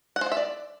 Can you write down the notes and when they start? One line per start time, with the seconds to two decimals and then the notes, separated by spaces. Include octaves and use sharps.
0.16 F#5
0.21 C5
0.26 F#5
0.32 E5
0.37 D5